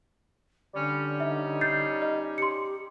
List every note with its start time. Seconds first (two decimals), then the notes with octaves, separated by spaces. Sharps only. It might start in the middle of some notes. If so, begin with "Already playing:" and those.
0.74 D3 G3 C#4 D5
1.20 D#4 E5
1.61 G6 A6 C7
2.02 D#5
2.38 G4 C6 C#7